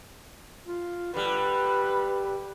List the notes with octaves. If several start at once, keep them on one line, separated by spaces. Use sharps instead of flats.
F4
D3 G3 B4